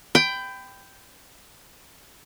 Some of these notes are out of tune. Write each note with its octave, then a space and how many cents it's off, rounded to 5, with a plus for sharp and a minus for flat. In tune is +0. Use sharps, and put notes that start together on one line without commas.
G5 +0 B5 +30